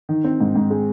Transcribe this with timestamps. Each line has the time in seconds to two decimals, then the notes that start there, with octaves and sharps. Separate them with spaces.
0.09 D#3
0.24 C4
0.40 G#2
0.56 G#2
0.70 G#3